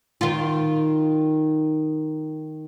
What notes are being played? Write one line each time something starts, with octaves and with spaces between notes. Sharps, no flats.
D#3 F4